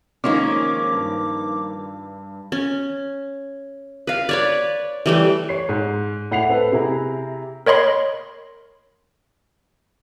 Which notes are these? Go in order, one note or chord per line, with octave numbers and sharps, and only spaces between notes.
D#3 F3 G#3 A#3 C#4 D#4 D6
G2
C#4
B4 F5
B4 C#5 D5
E3 G3 A3
C#5 C7
G#2
A2 F#5 C7 F7
C4 A4 B4
C3 E4 G#4 E5 A#5
A#4 C#5 D#5 B5 C6